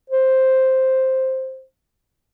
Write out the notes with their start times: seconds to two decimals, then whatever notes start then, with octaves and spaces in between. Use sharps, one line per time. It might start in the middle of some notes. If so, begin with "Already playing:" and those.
0.10 C5